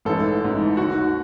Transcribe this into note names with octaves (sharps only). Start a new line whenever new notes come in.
A1 G#2 E3 A4
A1 G#2 E3
D#2 D#3 F#4